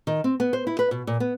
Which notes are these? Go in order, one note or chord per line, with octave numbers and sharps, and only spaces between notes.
D#3
C4
B3
C5
E4
B4
B2
A#2
B3